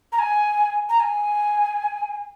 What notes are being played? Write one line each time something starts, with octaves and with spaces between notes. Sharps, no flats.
A#5
G#5
A#5
G#5